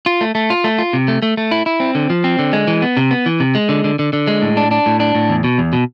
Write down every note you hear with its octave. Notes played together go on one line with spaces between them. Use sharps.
F4
A3
A3
F4
A3
F4
C3
A3
A3
A3
E4
E4
C4
D3
F3
C4
D3
G#3
E3
B3
C3
B3
E3
C3
G#3
D3
D3
D3
D3
G#3
A2
D4
D4
A2
D4
A2
E2
B2
E2
B2